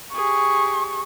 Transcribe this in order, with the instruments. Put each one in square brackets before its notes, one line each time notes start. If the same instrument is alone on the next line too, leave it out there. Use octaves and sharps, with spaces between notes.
[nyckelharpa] G4 G#4 [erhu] C#6